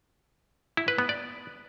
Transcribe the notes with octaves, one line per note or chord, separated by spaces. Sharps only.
E4
B4
B3
D5